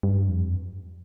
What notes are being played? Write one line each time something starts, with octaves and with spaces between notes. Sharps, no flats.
G2
F2